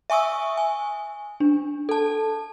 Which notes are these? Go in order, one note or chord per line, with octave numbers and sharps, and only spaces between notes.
E5 G#5 C#6 D#6 E6
G#5
D4
A4 A5